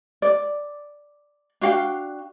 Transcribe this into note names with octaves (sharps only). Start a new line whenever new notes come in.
D5
D4 F#4 F5 G5